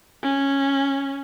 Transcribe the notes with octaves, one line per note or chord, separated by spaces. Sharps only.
C#4